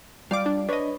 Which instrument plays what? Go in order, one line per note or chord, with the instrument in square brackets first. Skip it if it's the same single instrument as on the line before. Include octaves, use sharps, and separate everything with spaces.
[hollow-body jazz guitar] G3 F4 D5 [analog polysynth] F5 D6
[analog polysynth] D4
[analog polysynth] D4 D#5 [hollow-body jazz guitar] B4 C#5